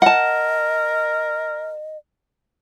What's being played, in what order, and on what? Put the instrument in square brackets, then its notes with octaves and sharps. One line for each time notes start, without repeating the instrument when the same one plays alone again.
[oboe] A#4 [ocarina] D#5 [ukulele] F#5 A5